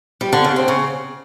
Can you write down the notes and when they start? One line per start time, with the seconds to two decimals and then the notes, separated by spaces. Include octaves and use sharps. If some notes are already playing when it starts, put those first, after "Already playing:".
0.21 G3
0.33 D3
0.44 C#3
0.56 C4
0.68 C#3